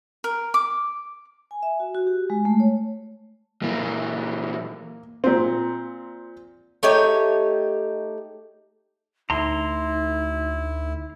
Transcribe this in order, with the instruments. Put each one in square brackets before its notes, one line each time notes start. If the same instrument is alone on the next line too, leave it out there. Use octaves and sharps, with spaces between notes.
[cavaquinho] A#4
D6
[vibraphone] G#5
E5
F#4
F#4
G4
G#3
A3
C#5
[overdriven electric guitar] A#2 E3 [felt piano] A#3
[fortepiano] A#2 C4
[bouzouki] A3 D#4 G4 C#5
[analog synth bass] D2 [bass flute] D#4 [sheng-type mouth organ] E4 [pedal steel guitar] A#5 C6